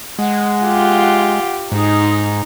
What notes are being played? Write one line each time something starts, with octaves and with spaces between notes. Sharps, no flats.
G#3 F#5
F4 G4
G#2 D#4 G#4